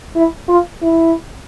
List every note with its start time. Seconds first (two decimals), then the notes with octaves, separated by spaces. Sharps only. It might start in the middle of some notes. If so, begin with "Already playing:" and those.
0.16 E4
0.49 F4
0.82 E4